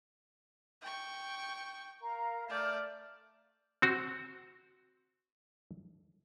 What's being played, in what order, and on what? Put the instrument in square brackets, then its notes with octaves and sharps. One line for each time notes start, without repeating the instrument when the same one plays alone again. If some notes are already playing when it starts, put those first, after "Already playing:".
[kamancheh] G5 C#6
[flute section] A#4 F5 A#5
[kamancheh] A3 D5 [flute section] E5 F6 G6
[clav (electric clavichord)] C4 F#4